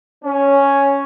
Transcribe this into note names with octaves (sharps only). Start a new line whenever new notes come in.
C#4